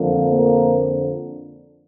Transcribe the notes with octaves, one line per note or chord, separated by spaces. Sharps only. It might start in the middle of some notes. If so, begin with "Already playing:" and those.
Already playing: F2 D3 F3 A#3
A#3